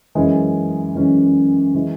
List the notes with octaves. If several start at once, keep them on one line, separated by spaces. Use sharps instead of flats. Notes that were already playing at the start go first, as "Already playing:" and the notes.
F#2 E3 G#3 C#4
F#2 E3 G#3 C#4
E3 G#3